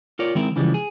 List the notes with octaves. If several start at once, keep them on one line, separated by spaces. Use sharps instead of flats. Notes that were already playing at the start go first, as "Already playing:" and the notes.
F4 A#4 C#5 D5
D#3 G#3 C4 E4 A#4
C#3 E3 F3 G3 G#3
G#4